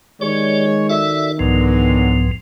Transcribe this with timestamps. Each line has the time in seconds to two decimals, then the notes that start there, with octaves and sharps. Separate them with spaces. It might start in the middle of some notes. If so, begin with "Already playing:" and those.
0.21 D#3 G#3 G4 C#5 D5
0.90 F#4 A4 D5 E5
1.39 C2 G#2 D3 F3 F#3 G#3 B3